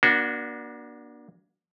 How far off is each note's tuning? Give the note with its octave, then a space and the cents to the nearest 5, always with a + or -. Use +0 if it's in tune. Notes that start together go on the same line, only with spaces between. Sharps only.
A#3 +40 D4 +0 F#4 -5